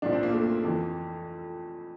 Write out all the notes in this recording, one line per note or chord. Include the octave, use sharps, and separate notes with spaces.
C2 A#2 F3 D4
C4
A#3
A3
F2 E3